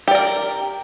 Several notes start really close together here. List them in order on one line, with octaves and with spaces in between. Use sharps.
G4 D5 A#4